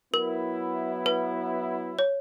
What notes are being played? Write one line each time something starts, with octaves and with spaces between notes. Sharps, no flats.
F#3 B3 E4 A#4
B4
C#5